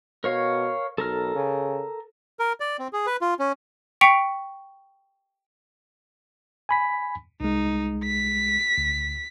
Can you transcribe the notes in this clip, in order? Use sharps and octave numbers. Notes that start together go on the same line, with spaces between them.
B2 A#4 C#5 F5
B1 A4 A#4 F6
C#3
A#4
D5
C4
G#4
B4
F4
C#4
G5 C#6 B6 C#7 D7 F7
G#5 B5 B6
C2 G#3 D#4
B6
D2